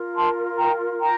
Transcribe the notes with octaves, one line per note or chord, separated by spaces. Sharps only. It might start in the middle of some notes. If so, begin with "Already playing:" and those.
Already playing: F4 A#4
A5 C6
G5 A#5
G5 A#5